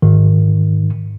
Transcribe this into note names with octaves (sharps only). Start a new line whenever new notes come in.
G#2 D#3